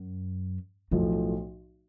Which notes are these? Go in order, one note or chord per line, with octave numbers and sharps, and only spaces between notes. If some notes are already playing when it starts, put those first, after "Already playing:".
Already playing: F#2
B1 F2 A2 F3 A3